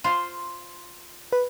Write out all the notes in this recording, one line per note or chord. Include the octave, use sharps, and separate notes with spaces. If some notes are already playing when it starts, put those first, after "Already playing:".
F4 C5
B4